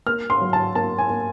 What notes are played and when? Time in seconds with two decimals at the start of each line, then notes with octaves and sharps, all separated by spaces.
0.07 A#3 F6
0.30 C6
0.41 F#3
0.53 A5
0.75 A#3 A5
0.99 G#5
1.10 A#3